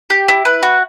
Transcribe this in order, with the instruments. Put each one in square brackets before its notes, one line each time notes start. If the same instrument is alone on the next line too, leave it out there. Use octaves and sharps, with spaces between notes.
[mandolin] G4
E4
B4
F#4